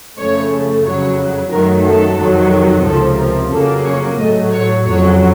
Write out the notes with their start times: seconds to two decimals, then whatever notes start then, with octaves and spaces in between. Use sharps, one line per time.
0.18 F2 C#3 A3 C#5
0.84 F2 C#3 F#3 C#5
1.51 F#2 D#3 F#3 A3 A#4
1.84 A4
2.18 F2 C3 D#3 F#3
2.85 C#2 C3 F3 A4
3.18 A#4
3.51 F2 C#3 F#3 A#3 A4
3.85 C#5
4.18 A2 F#3 A3 D#5
4.52 C#5
4.85 F2 C#3 F#3 C#5